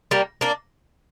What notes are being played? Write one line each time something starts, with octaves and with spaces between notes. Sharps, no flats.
G3 A#3
A#3 D4